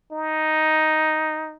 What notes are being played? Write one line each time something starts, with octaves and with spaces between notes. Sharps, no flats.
D#4